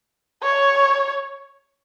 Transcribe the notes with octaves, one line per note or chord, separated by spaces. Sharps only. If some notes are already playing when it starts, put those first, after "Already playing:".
C#5